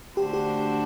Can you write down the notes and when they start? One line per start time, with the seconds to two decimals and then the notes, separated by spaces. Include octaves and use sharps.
0.17 D3 A3 D4 F#4 G4 C5
0.33 G4